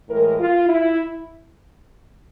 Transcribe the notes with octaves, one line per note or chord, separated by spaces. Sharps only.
A2 E3 G#3 A#4
F4
E4